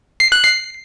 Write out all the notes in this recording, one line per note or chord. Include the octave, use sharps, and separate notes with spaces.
C7
F#6
C7